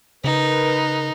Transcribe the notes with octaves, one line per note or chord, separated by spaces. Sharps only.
C#3 D#4 A#4 B4